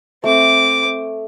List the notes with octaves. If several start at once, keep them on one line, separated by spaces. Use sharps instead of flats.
A3 C4 D6